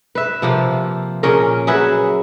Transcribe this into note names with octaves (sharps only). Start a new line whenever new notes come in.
B4 E5
C3 F3 A#3
A#2 C#3 C#4 A#4
F#3 G#4 B4 E5